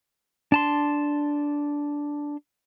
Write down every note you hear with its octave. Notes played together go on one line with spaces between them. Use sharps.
D4 A5 C6